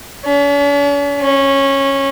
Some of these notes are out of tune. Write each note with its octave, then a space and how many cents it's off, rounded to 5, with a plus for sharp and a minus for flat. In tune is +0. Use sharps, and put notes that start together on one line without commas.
C#4 +45
C#4 -15